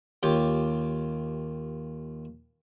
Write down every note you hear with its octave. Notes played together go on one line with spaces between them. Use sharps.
D#2 F4 G4 C#5 G5 D6